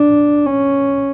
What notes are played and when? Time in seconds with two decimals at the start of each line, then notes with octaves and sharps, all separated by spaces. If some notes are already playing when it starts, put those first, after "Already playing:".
Already playing: D4
0.46 C#4